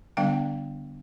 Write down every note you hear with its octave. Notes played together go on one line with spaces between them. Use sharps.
D3 G3 B3 D4 F5 G5